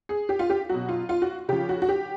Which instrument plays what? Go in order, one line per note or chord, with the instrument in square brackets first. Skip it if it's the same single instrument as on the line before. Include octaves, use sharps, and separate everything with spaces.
[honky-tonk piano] G#4
G4
F4
G4
F#3 F#4
B2
F4
F4
F#4
C#3 F3 G4
F#4
F#4
G4